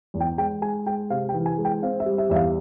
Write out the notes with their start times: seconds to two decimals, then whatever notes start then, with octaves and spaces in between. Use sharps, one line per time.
0.14 E2
0.20 G5
0.38 G#3 G5
0.62 G#3 G#5
0.86 G#3 G5
1.10 C3 F5
1.29 G5
1.34 E3
1.46 G#5
1.58 G#3
1.65 G5
1.82 C4 F5
2.00 E5
2.06 G3
2.18 E5
2.30 E2 E5
2.36 F5